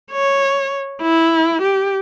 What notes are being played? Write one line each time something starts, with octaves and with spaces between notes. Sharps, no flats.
C#5
E4
G4